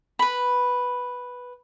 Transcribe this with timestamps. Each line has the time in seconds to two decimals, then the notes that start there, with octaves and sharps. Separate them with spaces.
0.19 B4 B5